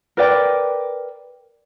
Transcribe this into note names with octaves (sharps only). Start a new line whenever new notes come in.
A#4 B4 D5 G5